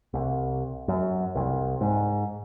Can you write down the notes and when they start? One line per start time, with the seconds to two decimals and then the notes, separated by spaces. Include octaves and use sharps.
0.13 C2
0.88 F#2
1.35 C2
1.81 G#2